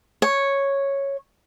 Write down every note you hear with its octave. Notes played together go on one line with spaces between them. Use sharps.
C#5